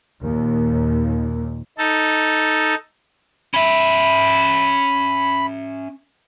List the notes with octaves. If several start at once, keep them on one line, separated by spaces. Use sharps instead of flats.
D#2 A#2
D#4 A4
C#4 E5 B5